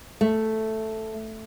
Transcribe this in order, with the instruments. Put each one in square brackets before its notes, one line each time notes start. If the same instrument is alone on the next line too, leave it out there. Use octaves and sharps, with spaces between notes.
[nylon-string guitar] A3